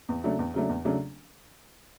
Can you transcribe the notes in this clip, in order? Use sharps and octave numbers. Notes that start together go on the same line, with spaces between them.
E2
C#3 F#3 A3 D4
E2
C#3 F#3 A3 D4
E2
C#3 F#3 A3 D4